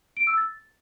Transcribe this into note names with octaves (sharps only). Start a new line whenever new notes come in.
D7
E6
A6